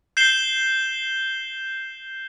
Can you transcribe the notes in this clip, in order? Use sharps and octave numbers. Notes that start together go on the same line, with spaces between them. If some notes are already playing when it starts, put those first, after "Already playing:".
G6 C7 E7 G7